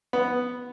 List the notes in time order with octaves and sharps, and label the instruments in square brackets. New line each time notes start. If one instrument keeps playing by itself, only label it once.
[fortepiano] B3